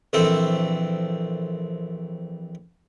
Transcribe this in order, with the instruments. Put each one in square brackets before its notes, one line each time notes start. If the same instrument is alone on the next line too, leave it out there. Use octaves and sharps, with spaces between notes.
[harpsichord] A#1 E3 C4 A4